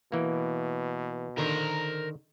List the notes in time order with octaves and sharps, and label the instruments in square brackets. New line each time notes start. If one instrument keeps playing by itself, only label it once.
[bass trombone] B2 [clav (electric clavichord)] E3 A#3
[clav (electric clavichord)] D3 D#3 [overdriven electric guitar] A#4 C5